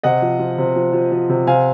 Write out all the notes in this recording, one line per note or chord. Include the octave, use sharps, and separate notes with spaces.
C3 D#5 F#5
F3
F3
C3
F3
F3
F3
C3
C3 F5 G#5